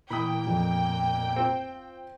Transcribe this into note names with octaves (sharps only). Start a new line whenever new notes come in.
A#2 E3 G5 B5 D#6
F2
C4 F4 C5